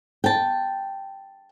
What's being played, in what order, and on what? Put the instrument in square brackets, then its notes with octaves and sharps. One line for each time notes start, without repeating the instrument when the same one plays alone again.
[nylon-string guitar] G5 A5